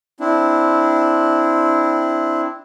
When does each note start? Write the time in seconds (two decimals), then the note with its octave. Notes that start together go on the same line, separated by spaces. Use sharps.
0.20 C4 D4 E4